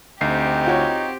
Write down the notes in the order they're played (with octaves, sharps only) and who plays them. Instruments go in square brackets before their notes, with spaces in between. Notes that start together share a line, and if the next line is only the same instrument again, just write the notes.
[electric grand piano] D2 [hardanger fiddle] C4 G4 [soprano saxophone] D#4 [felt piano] C7
[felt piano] F4 F#4 C#5